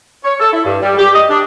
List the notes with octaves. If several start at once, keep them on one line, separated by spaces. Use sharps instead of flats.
C#5
A4
E4
G2
G3
G4
D#5
D4